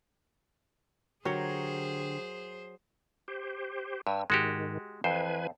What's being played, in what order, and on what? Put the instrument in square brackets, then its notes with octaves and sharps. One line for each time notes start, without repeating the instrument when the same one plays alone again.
[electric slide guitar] D3 G4 [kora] F#3 A#4 C#5 [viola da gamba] G#4 C5
[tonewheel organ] G4 C5
[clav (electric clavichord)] G2 [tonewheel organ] E6
[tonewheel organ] G#2 D#3 [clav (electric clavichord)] G#3 F#4 G4
[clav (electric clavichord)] F2 C5 [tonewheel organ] E3 B4 G#5